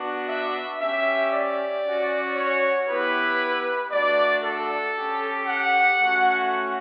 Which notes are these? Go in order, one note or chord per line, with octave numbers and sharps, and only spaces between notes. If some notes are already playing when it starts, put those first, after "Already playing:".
Already playing: B3 D4 F#4
E5
C#4 G4 E5
D5
C#4 F#4
C#5
B3 E4 G4 B4
A3 D4 F#4 D5
A4
C#4 G4
F#5
A3 C#4 F#4